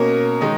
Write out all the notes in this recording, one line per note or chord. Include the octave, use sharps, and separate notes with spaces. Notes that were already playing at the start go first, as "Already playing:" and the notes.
Already playing: B2 A#3 C#4 A#4
D#3 G#3 D#4